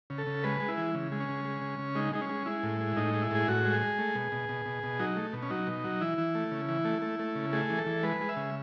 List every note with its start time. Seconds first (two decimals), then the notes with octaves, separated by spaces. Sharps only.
0.10 C#3
0.18 A4
0.27 C#3
0.44 G#3 B4
0.60 G#3
0.69 E4
0.77 E3
0.94 C#3
1.12 G#3
1.20 C#4
1.28 C#3
1.45 G#3
1.62 C#3
1.79 C#3
1.95 G#3 D#4
2.13 G#3 D#4
2.21 C#4
2.29 G#3
2.46 G#3 E4
2.63 A2
2.80 G#3
2.97 A2 D#4
3.14 G#3
3.22 E4
3.31 A2 G#4
3.48 A2 F#4
3.65 G#3
3.73 G#4
3.81 G#3
3.99 A3
4.15 B2
4.32 B2
4.49 B2
4.66 B2
4.83 B2
4.99 F#3 D#4
5.17 A3
5.33 B2
5.43 C#4
5.50 F#3 D#4
5.67 B2
5.84 F#3
6.01 E3 E4
6.18 E3
6.35 A3
6.52 C#3
6.69 E3
6.85 A3
7.02 A3
7.19 A3
7.35 C#3
7.53 A3 G#4
7.70 E3
7.78 A4
7.86 E3
8.03 G#3 B4
8.21 G#3
8.29 E5
8.37 C#3